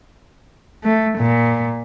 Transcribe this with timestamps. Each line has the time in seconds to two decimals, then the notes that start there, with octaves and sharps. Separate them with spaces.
0.84 A3
1.18 A#2